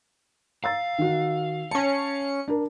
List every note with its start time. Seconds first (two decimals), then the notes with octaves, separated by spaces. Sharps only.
0.64 F5 A#5 E6 A6
0.99 D#3 F#4
1.71 C#4 A5 C#7
2.48 D4 A#4